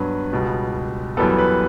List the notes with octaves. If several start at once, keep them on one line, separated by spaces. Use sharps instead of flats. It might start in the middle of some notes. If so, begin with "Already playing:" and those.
Already playing: G2 F#3 B3 B4
C#2 B2 G3 B3
F#2 E3 G3 B3 A4
B4